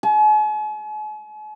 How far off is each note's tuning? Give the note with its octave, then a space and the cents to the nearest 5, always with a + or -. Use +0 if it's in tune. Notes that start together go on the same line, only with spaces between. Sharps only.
G#5 +45